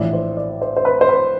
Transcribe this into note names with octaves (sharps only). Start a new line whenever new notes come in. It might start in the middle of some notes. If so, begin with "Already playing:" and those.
Already playing: A#1 A2 E3 D5
C5
D5
C5
C5
B4
C5
B4